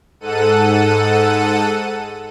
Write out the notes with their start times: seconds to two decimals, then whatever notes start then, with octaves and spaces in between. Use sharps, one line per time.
0.20 G#2 A4 F#5 D#7